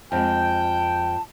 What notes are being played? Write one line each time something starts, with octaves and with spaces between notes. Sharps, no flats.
F2 G#3 G5 A5